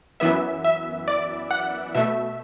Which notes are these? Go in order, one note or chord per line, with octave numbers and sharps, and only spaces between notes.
F#2 E3 B3 E5
E5
D5
F#5
B2 A3 E5